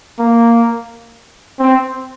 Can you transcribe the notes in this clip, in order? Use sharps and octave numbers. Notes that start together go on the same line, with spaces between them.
A#3
C4